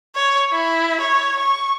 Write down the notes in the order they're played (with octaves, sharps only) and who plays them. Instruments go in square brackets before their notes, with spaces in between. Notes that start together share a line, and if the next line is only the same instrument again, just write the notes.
[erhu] C#5
E4
C#5
C#6